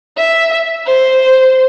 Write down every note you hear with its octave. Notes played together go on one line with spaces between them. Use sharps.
E5
C5